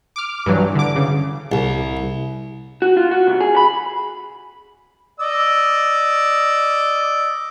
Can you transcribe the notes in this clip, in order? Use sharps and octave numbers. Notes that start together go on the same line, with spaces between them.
D6 F6
G2 E3 F#3
D3 D6
C#3
C2
F#4
F4
F#4
C2
G#4
B5
D5 D#5 E6